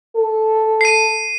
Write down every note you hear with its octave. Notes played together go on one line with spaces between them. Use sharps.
A4
C7 D#7